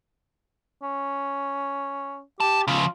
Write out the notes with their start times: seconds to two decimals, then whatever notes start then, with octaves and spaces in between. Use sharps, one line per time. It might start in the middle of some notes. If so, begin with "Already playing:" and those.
0.83 C#4
2.40 G4 A5
2.68 C#3 F3 F4